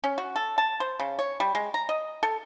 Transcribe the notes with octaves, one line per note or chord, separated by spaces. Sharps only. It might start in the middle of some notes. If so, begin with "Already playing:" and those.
C#4
F#4
A4
A5
C5
C#3
C#5
G3
G#3
A#5
D#5
A4